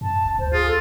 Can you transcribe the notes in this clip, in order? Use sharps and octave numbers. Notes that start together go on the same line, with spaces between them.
F#2 A5
E1
D2 C5
F4 G#4
A4